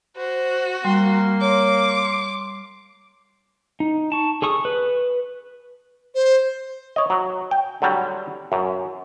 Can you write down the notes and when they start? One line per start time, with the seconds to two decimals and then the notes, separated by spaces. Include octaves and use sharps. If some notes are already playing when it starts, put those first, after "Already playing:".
0.17 F#4 C5
0.85 G3 A#3 C6
1.41 C#5 D6
3.80 D#4
4.12 A5 C#6
4.42 G#4 A4 C#6 D#6
4.65 B4
6.15 C5
6.96 C#5 D#5
7.10 F#3
7.51 G5
7.82 D3 F#3 G3
8.52 F#2